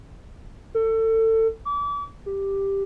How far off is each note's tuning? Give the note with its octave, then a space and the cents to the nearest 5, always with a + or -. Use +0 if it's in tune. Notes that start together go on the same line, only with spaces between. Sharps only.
A4 +25
D6 -35
G4 +5